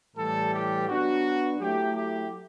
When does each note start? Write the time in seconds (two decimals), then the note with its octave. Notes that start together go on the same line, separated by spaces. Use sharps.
0.17 A2 E3 G3 A4
0.53 G4
0.88 F#3 B3 D4 F#4
1.60 F#3 A3 E4 G4
1.96 G4